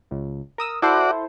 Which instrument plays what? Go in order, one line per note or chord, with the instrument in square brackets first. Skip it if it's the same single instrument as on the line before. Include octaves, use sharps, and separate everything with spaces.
[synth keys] C#2
A#4 D#6 E6
[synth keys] E4 A4 C5 [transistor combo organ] F#4 D5